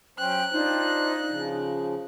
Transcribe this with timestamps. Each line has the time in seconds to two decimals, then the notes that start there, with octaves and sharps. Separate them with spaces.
0.19 F#3 C#4 C5 G5 F#6
0.52 D4 D#4 F4 C5
1.29 C#3 F3